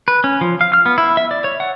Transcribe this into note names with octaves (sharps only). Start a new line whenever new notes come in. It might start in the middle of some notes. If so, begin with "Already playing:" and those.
B4
C#4
F3
F5
F6
B3
E4
E5
D5
C#5
F#5